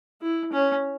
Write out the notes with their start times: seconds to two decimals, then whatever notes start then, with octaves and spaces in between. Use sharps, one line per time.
0.22 E4
0.52 C#4